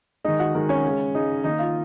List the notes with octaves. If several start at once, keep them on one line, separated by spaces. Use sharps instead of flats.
D#3 G#3 D#4 D#5
F#4 F#5
D#3 G#3 A#4
C#4 C#5
C#3 G#3
C#3 G#3 D#4 D#5
D#3 A#3 D#4 D#5
F4 F5